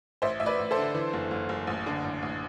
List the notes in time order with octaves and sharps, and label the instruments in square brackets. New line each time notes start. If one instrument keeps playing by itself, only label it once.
[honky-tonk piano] A1 C5 E5
A1 E5
B4 D5
A1
A4 C5
D3
E3
F#1
F#1
F#1
A1
D3
A1
A1